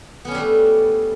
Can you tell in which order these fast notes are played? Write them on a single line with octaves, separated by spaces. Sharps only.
B3 C#4 D4 G3 A3